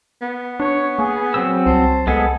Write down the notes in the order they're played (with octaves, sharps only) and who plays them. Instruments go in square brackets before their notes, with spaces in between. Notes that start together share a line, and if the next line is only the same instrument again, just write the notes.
[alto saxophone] B3
[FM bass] D4 [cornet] C#5
[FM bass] A#3 [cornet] G#4
[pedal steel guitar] F#3 C4 E6
[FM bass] C2 [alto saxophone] C5 [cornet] A5
[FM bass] C2 [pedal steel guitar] G#3 B3 G#4 [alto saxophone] A4